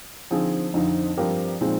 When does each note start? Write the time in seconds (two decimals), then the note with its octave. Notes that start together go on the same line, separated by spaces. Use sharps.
0.30 D3 F3 C4 D#4 G#4
0.74 F2 D3 F3 C4 D#4
1.17 G2 F3 C4 G4 A#4
1.61 A#2 F3 G#3 C4 D#4